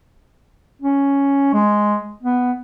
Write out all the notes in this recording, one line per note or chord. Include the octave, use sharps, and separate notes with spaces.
C#4
G#3
B3